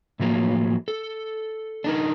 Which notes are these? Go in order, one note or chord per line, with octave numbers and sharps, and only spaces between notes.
A2 D3 F3 F#3 A#3
A4
D4 D#4 A#4